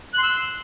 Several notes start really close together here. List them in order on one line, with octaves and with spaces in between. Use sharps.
F#6 C6 E6